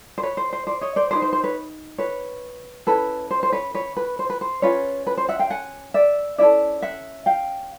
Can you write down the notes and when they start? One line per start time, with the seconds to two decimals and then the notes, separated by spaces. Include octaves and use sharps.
0.18 C5
0.23 B4 C#5
0.37 C5
0.53 C5
0.67 C5 D5
0.81 C#5 D#5
0.96 C5 D5
1.11 D#4 G#4 B4 C5 D5
1.22 C5
1.33 C5
1.44 B4 C#5
1.98 B4 C#5
2.87 C#4 E4 A4 B4
3.31 C5
3.43 C5
3.52 B4 C#5
3.74 B4 C#5
3.97 B4
4.19 C5
4.30 B4
4.41 C5
4.62 C#4 F4 G#4 B4 C#5
5.07 B4
5.17 C5
5.29 E5 F#5
5.39 F5 G5
5.50 F#5 G#5
5.94 D5 E5
6.38 C#4 E4 A4 D5 E5
6.82 E5 F#5
7.26 F5 G5